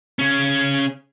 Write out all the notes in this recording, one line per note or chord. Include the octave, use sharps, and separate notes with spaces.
C#3 C#4